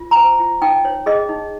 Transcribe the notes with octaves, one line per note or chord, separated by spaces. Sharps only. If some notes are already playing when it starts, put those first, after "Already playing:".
Already playing: F4
A#5
C5 G#5
F4
D#4 G5
C#5
G#4 D#5
D#4